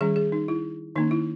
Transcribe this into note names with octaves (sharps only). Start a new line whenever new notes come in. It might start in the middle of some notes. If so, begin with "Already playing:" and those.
D#3 G3 C#4 G#4
G#4
D#4
E4
D#3 A#3 C#4 D#4
E4